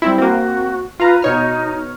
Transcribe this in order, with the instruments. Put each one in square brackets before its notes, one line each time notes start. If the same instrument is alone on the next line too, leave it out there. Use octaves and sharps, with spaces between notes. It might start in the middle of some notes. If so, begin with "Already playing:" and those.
[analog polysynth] G3 C4 E4
[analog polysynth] A#3 C4 [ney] F#4
[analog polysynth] F4 F5 A#5 [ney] B4
[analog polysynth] B2 C#5 F6 [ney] D#4